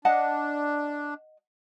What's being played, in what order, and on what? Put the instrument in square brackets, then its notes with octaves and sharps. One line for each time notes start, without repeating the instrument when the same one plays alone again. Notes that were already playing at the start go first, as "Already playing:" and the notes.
[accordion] D4 [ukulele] D#5 F#5 A5